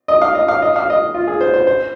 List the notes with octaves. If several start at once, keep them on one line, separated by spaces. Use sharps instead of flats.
D#5
F5
D#5
F5
D#5
F5
D#5
F4
G#4
C5
C5
C5